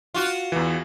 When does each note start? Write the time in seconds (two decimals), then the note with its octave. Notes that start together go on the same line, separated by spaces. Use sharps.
0.14 F4 F#4
0.52 E2 E3